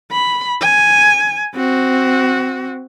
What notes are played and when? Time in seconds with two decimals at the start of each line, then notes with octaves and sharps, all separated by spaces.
0.11 B5
0.61 G#5
1.54 C4 F#4